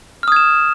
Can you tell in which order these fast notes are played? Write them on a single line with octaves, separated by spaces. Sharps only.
F6 D#6 G#6 E7